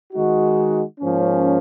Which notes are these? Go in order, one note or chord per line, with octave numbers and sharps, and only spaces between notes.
D#3 G#3 D#4 F#4
G#2 F3 A#3 C#4